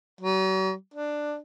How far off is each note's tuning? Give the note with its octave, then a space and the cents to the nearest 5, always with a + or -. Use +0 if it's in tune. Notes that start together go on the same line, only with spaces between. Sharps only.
F#3 +45
D4 +10